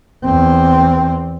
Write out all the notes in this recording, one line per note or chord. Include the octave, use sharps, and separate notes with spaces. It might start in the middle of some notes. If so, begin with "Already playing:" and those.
E2 C4